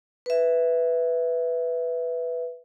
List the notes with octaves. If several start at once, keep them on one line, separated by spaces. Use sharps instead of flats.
B4 E5